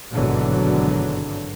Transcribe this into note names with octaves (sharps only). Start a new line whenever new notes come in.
G#1 G2 B2 D3 E3 F#3